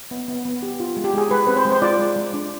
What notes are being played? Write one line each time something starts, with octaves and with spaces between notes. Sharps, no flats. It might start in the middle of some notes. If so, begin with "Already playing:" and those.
B3
B3
B3
G4
F4
G#3
G4
G#3 G#4
G#3 B4
C4 B4
C5
G#3
C5
F4 D5
G#3
G#3
D4